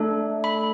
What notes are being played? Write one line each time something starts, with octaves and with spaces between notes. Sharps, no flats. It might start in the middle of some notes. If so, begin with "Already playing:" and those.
Already playing: A3 D4 A4
B5